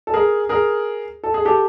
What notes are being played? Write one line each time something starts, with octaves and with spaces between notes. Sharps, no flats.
A4
G#4 A#4
G#4 A#4
A4
G#4
G4 A4